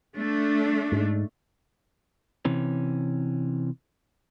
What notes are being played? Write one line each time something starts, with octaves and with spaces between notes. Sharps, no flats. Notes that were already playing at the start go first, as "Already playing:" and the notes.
A3 D4
G#2
C3 E3 C#4